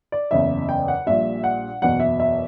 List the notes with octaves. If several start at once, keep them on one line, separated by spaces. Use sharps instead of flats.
D5
F#1 E2 C#3 E5
G5
F#5
A#1 A#2 G3 E5
F#5
F#1 E2 B2 F#5
E5
E5